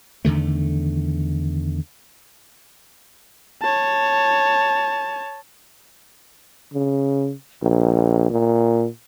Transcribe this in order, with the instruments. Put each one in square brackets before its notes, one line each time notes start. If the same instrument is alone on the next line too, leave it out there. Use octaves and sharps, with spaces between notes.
[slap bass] E2 D3 D#3 A3
[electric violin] C#5 A5
[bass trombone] C#3
A#1
A#2